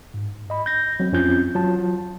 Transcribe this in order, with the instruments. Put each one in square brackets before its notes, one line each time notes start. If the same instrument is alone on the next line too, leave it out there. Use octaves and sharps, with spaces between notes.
[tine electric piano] G#2
D#5 B5
G6 A#6
F#3 C4
F2 C4 C#4 F4 G6
F#3 F4 A5